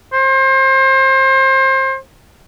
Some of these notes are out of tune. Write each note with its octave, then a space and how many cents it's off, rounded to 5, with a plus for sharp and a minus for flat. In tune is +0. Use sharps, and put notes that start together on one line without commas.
C5 +30